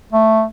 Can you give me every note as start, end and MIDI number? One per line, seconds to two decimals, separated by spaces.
0.12 0.44 57